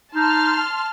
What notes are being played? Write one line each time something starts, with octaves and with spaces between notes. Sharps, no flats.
D#4 A5 C6 F6